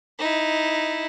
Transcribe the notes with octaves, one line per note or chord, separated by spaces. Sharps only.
D#4 E4